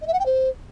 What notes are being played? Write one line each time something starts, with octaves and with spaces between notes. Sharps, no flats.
D#5
E5
F#5
G5
C5